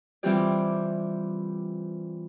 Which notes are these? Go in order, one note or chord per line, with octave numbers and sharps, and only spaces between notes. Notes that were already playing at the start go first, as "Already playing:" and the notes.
E3 G3 C4 F4 G4 D5